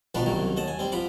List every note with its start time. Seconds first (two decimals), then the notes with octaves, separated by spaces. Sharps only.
0.15 B2 D#3 F3 D4 B4
0.26 C2 F#2 D#3 F#3
0.56 D#2 D#5 F#5 A5
0.68 G#5
0.79 G3 C4
0.92 F3 F#5 B5 D6